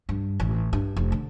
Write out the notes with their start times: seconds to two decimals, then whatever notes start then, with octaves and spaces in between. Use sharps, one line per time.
0.09 G2
0.40 A1
0.73 G2
0.96 F1
1.12 D3